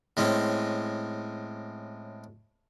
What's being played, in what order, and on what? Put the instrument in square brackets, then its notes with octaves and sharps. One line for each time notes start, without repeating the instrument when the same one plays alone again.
[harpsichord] A2 G#3 C4 C#4